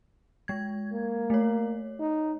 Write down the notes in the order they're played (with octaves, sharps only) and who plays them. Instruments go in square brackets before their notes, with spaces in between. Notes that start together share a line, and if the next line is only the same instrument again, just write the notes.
[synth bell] G#3 G#6
[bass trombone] A#3
[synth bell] A3 C#5
[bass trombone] D#4